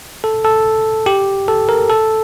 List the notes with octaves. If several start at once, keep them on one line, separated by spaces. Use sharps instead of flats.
A4
A4
G4
A4
A#4
A4